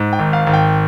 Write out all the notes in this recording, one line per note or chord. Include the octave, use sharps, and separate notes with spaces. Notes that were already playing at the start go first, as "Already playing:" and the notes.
Already playing: G#2
G5
G#1
F5
G#1
G5